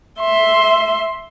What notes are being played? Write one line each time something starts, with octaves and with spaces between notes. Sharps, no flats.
E5 C6